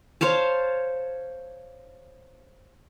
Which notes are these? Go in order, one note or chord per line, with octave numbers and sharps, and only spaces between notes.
C5 C#5 F5 A5